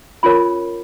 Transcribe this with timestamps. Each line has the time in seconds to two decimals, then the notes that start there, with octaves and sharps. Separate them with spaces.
0.23 C#4 F4 A#4 C#5 B5